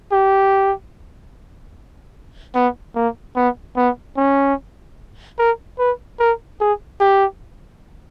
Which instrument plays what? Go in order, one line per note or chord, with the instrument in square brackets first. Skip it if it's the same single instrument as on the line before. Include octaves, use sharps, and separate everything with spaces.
[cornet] G4
B3
A#3
B3
B3
C#4
A#4
B4
A#4
G#4
G4